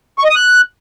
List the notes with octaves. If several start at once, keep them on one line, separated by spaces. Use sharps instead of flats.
C#6
D#5
D#6
F#6